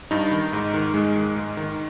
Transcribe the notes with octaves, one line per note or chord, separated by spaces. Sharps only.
G2 D#4
D#3
G#2
D#3
G#2 G#3
D#3
G#2
D#3